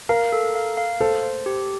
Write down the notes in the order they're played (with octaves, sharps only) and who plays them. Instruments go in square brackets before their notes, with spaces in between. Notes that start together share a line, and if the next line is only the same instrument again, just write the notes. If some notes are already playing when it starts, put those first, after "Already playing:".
[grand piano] A#4 [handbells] F5
[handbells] A4
F5
F5
[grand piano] A4 [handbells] C5
[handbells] C5
G4